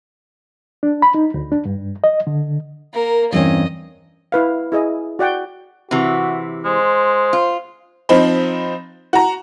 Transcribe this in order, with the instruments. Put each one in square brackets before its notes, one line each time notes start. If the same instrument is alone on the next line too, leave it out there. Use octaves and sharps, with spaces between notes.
[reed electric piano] D4
B5
D#4
D2
D4
G2
D#5
D3
[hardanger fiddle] A#3 A#4
[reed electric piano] E2 E3 [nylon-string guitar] G2 C4 C#4 [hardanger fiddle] D#5
[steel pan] E4 B4 F5
E4 G#4 D#5
F#4 D5 F#5 G5
[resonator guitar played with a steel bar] C3 E3 [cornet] F#4
[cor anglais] G#3 [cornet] C5
[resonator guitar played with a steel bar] F4
[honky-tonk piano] F3 C4 D#4 B5
F#4 A#5